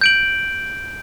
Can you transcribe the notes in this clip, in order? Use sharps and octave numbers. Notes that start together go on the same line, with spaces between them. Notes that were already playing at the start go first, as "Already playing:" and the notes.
G6 D7 F#7